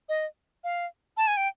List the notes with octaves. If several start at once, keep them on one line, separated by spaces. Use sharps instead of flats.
D#5
F5
A5
G#5
G5